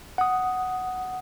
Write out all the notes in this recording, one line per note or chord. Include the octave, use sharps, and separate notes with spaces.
F#5 D#6